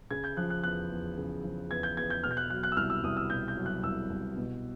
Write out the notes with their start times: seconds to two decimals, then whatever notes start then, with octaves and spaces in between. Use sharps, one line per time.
0.11 C#3 G#6
0.24 G6
0.37 F3 F#6
0.50 F#6
0.64 E2 F#6
0.90 E2
1.17 C#3
1.43 F3
1.70 E2 G#6
1.83 G6
1.97 E2 G#6
2.10 G6
2.24 B2 F6
2.31 G6
2.37 F#6
2.50 F#3 F#6
2.63 F#6
2.72 E6
2.77 C2 F6
2.90 E6
3.03 C2 D#6
3.17 E6
3.30 B2 G6
3.48 G6
3.57 F#3
3.66 F#6
3.83 C2 E6
4.10 C2
4.37 B2